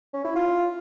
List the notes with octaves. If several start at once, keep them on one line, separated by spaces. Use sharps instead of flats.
C#4
E4
F4